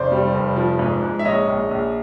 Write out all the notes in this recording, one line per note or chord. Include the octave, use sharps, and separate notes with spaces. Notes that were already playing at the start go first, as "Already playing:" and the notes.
Already playing: F1 C5 D5
G3
F1
F3
G#2
G#2
E5
A#1 C#5 D#5
A#1
A#1